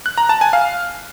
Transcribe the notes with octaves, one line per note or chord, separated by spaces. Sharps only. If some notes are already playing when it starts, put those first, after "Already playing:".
F#6
A#5
A5
G#5
F5